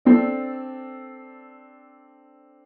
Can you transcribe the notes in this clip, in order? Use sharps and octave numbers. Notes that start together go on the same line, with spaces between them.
C4 D4 A4 D5